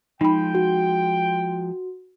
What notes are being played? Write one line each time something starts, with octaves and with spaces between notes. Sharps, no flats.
F3 G#3 D#4 G5 B5
F#4